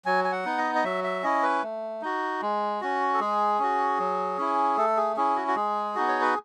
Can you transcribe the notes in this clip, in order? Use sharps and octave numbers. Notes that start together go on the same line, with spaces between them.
F#3 G#5
G#5
F#5
B3 D#4
D#5
D#5
F#3 E5
E5
C#4 E4 D#5
B4
A3
D#4 F#4
G#3
C#4 F#4
A4
G#3 G#4
C#4 F#4
F#3
C#4 E4
A3 A4
G#4
C#4 E4 G#4
F#4
F#4
G#3 G#4
B3 D#4 F#4
C#5
B4